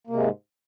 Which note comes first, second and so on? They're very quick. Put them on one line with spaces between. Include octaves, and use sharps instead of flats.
A#3 C3 G#3 G#2